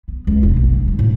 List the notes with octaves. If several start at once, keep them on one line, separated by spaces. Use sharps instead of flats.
B3
C#2
E1
A#1
D2
D#4
A2